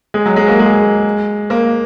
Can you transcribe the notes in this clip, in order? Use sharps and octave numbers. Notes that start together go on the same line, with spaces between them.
G#3
F#3
G#3
A#3
G#3
A#3